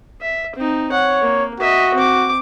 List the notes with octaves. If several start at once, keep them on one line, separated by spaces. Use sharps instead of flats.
E5
C4 D#4
C#5 F#5
A#3
F#4 D#5 E5
C4 D6